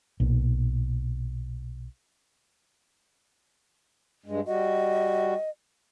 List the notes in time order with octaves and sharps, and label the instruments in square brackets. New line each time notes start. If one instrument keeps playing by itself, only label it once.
[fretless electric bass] B1 A#2
[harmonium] G2 G#3
[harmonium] G3 F#4 [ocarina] D#5